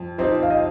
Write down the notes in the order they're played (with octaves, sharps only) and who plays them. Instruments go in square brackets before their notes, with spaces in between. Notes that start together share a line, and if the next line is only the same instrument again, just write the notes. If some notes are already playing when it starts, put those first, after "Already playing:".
Already playing: [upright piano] F2
[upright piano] F3 C4 D#4 G4 [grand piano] C5
[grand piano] F5
D#5